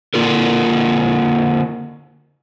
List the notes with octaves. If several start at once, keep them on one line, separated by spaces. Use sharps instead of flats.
D3 A#3 F4 A4 A#4